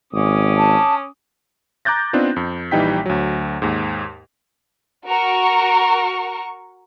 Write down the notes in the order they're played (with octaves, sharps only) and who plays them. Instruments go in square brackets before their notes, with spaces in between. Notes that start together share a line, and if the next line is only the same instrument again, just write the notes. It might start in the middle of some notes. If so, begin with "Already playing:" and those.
[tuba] G#1 [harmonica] C#4 D6 D#6
[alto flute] A5
[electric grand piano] A#5 D6 F#6 G6 A6 A#6
B3 C4 D4 D#4 F4
F2
A#1 E3 G3 D#4 G5 B6
D2 F#3
D#2 G#2
[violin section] F#4 A#4 C#6